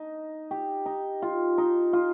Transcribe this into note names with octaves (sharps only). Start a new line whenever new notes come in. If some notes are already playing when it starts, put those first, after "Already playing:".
Already playing: D#4
G4
D#4
F4
D#4
F4